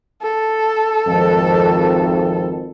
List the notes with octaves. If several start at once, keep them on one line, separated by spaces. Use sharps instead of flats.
A4
G#1 F2